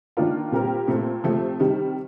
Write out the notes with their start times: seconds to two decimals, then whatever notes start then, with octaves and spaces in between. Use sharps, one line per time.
0.17 D#3 A#3 D4 F4 A#4
0.52 A#2 G3 C4 G4 A#4
0.88 A#2 A3 C4
1.24 C3 F3 A3 C4
1.60 C3 D#3 G3